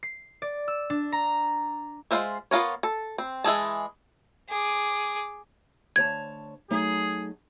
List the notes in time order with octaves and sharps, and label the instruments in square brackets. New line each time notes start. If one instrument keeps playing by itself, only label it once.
[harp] C7
D5
E6
D4
A#5
[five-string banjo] G#3 D4 F4 C5 E5
B3 F4 A#4 C#5
A4
C4
E3 G#3 E4 G#4 A5
[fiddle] G#4 D6
[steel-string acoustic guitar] D2 C#5 A5 [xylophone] G#6
[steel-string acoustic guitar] F#3 A3 D#4 [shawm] G#4